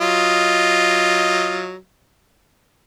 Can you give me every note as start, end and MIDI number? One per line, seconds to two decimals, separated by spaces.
0.01 1.75 54
0.01 1.75 65
0.01 1.75 75